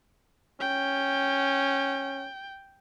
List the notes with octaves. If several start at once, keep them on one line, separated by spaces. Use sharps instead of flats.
C#4 G5